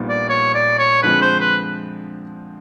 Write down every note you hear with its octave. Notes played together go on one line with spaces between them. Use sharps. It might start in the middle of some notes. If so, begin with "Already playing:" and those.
Already playing: A#1 A#2 G3 B3 D#4
D5
C#5
D5
C#5
D3 F3 G#3 C4 B4
C5
B4